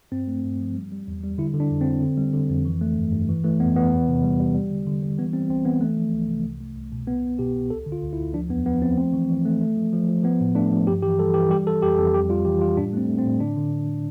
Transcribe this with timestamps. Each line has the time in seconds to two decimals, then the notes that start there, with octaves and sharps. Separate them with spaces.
0.12 G2 C4
0.28 A3
0.44 G2
0.60 F3
0.75 G3
0.91 G3
1.08 E2
1.23 G3
1.38 D3 E4
1.54 D3
1.60 D4
1.71 F2
1.81 C4
1.87 D3
2.02 D3
2.17 G3
2.34 D3
2.50 F2
2.65 E3
2.81 A3
2.97 G2
3.12 G2
3.29 E3
3.44 E3 A3
3.60 F2 B3
3.75 E3 B3
3.92 E2
4.08 C3
4.23 G3
4.40 G3
4.54 G3
4.70 D3
4.87 D3
5.03 G3
5.18 E3 B3
5.33 G3 C4
5.49 C2 C4
5.65 E3 B3
5.81 A3
5.97 F3
6.13 C2
6.28 C3
6.44 C2
6.61 A3
6.76 C2
6.92 B2
7.07 C2 B3
7.24 C2
7.39 B2 G4
7.55 C2
7.70 D2 A4
7.86 D3
7.92 F4
8.03 D2
8.13 E4
8.19 D2
8.34 F3 D4
8.50 E2 B3
8.66 F3 B3
8.82 F3 C4
8.97 A3 C4
9.13 E3
9.29 E3
9.45 A3
9.61 A3
9.77 F3
9.93 F3
10.09 F3
10.24 F3 B3
10.40 A2
10.55 A3 D4
10.71 F3
10.87 G2 G4
11.02 E3 G4
11.19 G3 A4
11.34 E3 G4
11.50 G3 G4
11.67 E3 A4
11.82 F2 G4
11.98 F2 A4
12.14 G3 G4
12.29 G3 F4
12.45 E3 G4
12.61 G3 F4
12.76 A2 D4
12.93 A3 C4
13.08 A3
13.19 C4
13.24 A2
13.40 D3 D4
13.57 D3
13.72 D3
13.88 D3